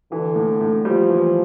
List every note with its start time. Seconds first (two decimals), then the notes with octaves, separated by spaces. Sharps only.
0.12 D3 E3
0.36 A2
0.61 A2
0.85 F3 G3
1.09 E3